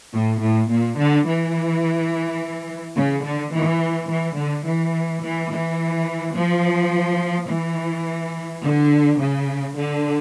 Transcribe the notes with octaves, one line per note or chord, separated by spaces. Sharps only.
A2
A2
A#2
D3
E3
C#3
D3
E3
E3
D3
E3
E3
E3
F3
E3
D3
C#3
D3